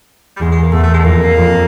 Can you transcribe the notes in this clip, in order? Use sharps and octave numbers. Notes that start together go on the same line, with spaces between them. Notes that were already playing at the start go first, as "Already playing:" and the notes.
G3
E2 G#3
G#3
A#3
E2 A3
A3
G#3
A3
F2 A#3
F2